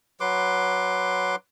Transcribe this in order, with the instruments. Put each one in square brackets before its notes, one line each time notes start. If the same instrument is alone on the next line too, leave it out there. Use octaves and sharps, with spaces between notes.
[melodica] F#3 B4 C6 D6